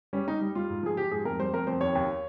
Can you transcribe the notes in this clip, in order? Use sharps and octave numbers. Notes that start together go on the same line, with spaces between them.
G3 C#4
G3 D#4
G3
G3 F4
G#2
F3 G#4
F3 G4
G#2 G#4
F2 A#4
G3 C5
F2 A#4
F2 C5
D#2 C#5
D#2